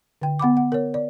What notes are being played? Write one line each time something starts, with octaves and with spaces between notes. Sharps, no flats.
D3 G5
B3 F#5 B5 D6
F#5
A#4 C#5
D5